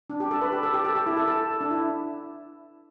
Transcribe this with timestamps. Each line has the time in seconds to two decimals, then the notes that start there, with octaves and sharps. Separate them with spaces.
0.10 D4
0.20 G4
0.31 A4
0.41 B4
0.52 G4
0.63 A4
0.74 G4
0.85 A4
0.96 G4
1.06 E4
1.17 A4
1.28 A4
1.61 D4
1.71 E4